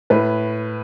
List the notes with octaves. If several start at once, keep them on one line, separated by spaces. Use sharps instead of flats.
A2 B4